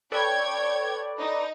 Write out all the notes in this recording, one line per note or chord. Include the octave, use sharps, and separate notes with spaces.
A4 B4 C#5 D5 G5 G#6
D#4